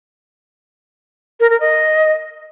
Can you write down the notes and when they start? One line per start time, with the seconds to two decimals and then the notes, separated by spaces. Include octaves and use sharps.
1.40 A#4
1.50 A#4
1.60 D#5